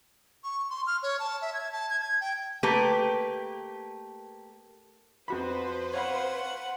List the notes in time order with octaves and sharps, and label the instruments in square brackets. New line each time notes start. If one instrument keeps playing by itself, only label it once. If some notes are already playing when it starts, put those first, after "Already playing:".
[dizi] C#6
C6
F6
C#5
A5
E5
G#6
A5
G#6
G#6
G5
[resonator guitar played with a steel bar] A3 A#3 G4 B4
[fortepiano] F2 F#4 B5 [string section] B4 C5
[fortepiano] C#5 F5 B5 [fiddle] F#5